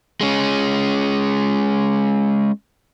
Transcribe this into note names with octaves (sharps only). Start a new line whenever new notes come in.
G#3 C#4